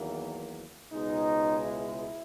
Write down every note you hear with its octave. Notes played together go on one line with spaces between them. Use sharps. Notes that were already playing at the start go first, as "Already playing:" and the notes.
Already playing: E2 D#3 F#3 A#3
C#2 B2 G#3 D#4
E4